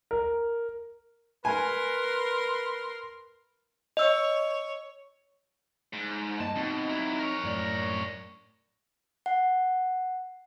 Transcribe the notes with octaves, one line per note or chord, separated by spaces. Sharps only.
A#4
A#4 B4 G#5 C6
C#5 D#5 E6
G#2
G2 A#3 D#5 A5
B2 C4 D#4 D#5
F#3 E4
A#4 C#5
F#2 A2 D5
F#5